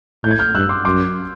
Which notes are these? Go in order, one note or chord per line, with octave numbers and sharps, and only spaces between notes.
A2 G6
G#6
F6 G6
G2 E6 F#6
C6 D6
F#2 C6 D6